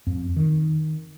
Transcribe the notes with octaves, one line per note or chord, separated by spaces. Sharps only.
F2
D#3